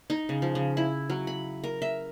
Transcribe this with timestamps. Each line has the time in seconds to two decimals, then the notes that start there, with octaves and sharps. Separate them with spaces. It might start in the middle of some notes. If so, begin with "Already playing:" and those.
0.10 D#4
0.29 C#3
0.42 F3
0.55 C#3
0.77 E4
1.10 F#3
1.27 B5
1.64 A#4
1.82 E5